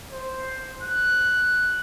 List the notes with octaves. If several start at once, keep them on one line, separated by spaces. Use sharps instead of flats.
C5
F#6